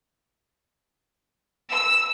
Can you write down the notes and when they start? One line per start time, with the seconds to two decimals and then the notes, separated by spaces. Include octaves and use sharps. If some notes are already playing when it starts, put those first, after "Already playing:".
1.71 E6